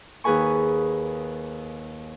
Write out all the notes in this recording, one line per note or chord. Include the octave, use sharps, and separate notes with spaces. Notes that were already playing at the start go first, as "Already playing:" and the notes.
D#2 G#4 B4 G#5 C#6